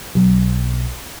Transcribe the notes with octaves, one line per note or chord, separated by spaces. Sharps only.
B1